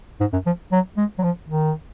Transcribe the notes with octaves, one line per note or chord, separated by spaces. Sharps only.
G#2
F#2
F3
F#3
G#3
F#3
F3
D#3